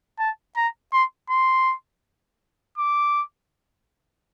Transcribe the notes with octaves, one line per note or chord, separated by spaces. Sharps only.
A5
A#5
C6
C6
D6